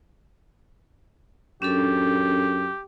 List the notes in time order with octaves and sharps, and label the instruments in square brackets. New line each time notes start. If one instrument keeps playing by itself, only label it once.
[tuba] F#2 [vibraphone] C#4 D4 A4 [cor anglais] G4